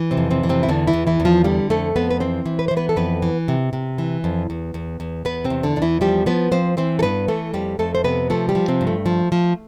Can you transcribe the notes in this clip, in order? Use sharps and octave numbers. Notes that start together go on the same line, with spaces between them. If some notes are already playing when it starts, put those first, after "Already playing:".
Already playing: E3
C3 C4
F2
C3 C4
E3
C3 C4
E4
E2 D3 D4
E3 E4
E2
E3 E4
E2
F3 F4
D3 G3 G4
F2 A3 A4
F2 B3 B4
B4
E3 C4 C5
E3
B4
E3 C5
B3 B4
A4
F2 B3 B4
E3
C3
C3
E3
F2
E2
E2
E2
E2 B3 B4
C3 C4
E2
D3 D4
E2 D4
E3 E4
F3 G3 G4
F3 B3 B4
F3 C4 C5
E3 C4 C5
A4
G2 B3 B4
E3 A3 A4
F2 G3 G4
F2 A3 A4
C5
C3 B3 B4
F3 A3 A4
G3 G4
F3
C3 C4
G2
A3
F3
F3